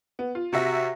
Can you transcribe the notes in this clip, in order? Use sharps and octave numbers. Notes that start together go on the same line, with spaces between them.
B3
F4
C3 F#4 E5 A#6